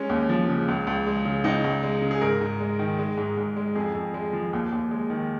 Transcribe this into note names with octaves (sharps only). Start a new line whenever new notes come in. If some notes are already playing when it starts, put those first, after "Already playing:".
Already playing: G#3 C#4
D#2
F3
C#3
C#2
C#2
G#3
C#3
C#2 D#4
C#2
G#3
C#3
G#4
G#2 A#4
G#2
G#3
D#3
G#3
G#2
G#2
G#3
F2 G#4
F2
G#3
F3
D#2
D#2
G#3
D#3